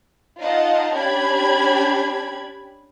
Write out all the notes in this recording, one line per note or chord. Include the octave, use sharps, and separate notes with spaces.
D#4 F4 D#5 F5 F#5 A5
C#4 D4 G4 B5 G#6